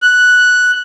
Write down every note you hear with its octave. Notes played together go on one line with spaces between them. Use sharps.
F#6